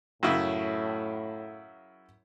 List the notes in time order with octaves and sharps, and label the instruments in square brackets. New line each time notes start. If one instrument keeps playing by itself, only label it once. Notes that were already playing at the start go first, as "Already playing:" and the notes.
[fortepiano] F#2 C#3 E4 [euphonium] A2